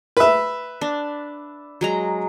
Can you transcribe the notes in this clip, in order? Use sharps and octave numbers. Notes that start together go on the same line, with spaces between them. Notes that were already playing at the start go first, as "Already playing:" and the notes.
B4 E5
D4
F#3 G#3 A#5